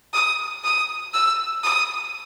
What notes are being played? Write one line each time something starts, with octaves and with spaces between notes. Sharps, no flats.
D#6
D#6
E6
D#6